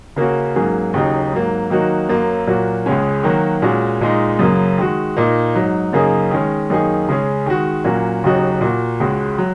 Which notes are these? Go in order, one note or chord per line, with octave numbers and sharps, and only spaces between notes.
C#3 A#3 C#4 F#4
G#2 F#3 A#3 C#4 G#4
D#2 C#3 F#3 D#4
G#2 F#3 A#3
D#3 F#3 A#3 D#4 F#4
F#2 F#3 A#3
A#2 F#3 A#3 F#4
C#2 C#3 G#3 C#4
D#3 F#3 A#3 F#4
A#2 G#3 C#4 F#4
A#2 G#3 D#4
F#2 C#3 F#3 A#3
D#3 G#3 F#4
A#2 A#3 D#4
G#2 F#3 D#4
F#2 C#3 A#3 D#4 G#4
D#3 G#3 C#4
F#2 D#3 A#3 D#4 G#4
C#3 G#3 C#4 G#4
D#3 G#3 F#4
A#2 F#3 A#3 C#4 F#4
D#2 C#3 F#3 D#4 F#4
A#2 A#3 F#4
C#2 C#3 G#3 F#4
F#3